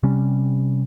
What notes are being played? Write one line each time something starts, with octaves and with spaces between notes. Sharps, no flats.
C3 G3 C#4